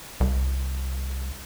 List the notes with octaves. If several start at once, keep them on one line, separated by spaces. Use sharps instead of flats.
C2